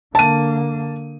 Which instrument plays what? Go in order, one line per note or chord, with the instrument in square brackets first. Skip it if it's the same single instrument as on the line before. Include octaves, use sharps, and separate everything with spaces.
[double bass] D3 A#3 [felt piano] A5 D#7